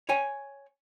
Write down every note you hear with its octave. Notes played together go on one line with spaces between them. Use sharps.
C#5 G5 G#5